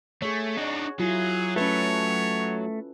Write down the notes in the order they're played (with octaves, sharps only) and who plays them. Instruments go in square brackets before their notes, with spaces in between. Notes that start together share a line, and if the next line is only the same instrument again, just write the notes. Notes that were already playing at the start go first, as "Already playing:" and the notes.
[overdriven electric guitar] A3 [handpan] G#4 C#5
[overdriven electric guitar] D4 D#4 [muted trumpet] F#4
[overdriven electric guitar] F#3 [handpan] E4 F4 [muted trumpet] G#4
[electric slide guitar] A3 [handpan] C#4 A4 B4 [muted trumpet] C#5